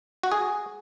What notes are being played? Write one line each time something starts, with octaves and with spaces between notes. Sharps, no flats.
F#4
G#4